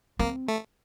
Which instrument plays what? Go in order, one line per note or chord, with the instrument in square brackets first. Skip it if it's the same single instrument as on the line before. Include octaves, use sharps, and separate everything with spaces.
[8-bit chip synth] A#3 [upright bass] C4
[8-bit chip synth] A3